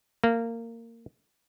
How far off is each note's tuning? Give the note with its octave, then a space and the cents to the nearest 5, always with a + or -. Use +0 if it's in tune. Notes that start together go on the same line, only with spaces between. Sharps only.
A#3 -20